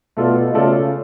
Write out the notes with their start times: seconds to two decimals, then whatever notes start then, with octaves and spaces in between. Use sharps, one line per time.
0.17 B2 A3 F4 A4 D5
0.53 C#3 A3 F4 A4 D5